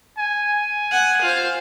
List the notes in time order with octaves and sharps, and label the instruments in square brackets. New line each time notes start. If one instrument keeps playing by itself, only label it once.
[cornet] G#5
[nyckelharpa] F#5
F4 C5